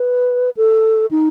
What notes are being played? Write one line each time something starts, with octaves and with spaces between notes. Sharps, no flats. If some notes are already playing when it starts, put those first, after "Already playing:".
Already playing: B4
A4
D#4